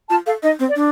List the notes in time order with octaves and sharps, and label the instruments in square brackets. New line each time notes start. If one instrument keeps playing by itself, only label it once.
[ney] F4 [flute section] A5
[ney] A4 [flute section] F5
[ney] D#4 [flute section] D#5
[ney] C4
[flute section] D5
[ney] D4